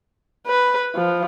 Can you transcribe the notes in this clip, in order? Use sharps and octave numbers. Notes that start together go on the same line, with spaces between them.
B4
F3